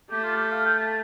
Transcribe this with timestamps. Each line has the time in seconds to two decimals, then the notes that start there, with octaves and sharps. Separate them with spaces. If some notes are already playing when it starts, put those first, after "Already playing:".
0.11 A3 G4
0.23 F4
0.35 G4
0.51 F5
0.65 G5
0.79 A5